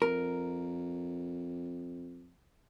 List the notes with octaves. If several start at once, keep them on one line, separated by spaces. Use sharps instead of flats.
F2 A#4